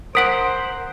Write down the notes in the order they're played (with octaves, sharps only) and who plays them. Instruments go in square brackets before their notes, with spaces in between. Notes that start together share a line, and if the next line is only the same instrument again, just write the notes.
[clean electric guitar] A#4 F#5 [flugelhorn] C5 [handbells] D#6 B6 D7